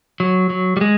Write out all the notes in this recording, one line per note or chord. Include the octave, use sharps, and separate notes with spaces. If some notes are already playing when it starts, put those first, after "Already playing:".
F#3
F#3
G3
G#3